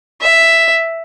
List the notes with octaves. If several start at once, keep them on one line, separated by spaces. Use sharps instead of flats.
E5